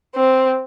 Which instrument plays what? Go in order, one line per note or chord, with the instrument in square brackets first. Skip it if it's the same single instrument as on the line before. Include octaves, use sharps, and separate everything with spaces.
[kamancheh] C4